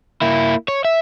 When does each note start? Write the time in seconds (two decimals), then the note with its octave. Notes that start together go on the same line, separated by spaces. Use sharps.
0.22 A#3 E4
0.68 C#5
0.85 E5